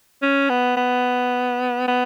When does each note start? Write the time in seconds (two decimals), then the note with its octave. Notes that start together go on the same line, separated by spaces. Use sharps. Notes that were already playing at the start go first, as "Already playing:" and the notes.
0.22 C#4
0.49 B3
0.77 B3
1.87 B3